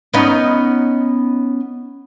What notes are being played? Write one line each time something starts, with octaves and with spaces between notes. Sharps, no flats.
B3 C#4 D#4